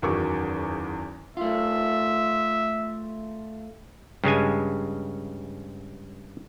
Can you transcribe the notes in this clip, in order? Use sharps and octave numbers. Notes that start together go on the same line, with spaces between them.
F#1 E2 D#3 F#4 C#6 D6
A3 F4 E5
G2 C#3 G#3 G#5